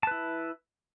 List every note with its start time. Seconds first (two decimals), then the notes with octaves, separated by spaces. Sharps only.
0.03 A5
0.07 B4
0.11 E4